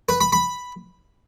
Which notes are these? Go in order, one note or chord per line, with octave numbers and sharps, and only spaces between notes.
B4
B5
B5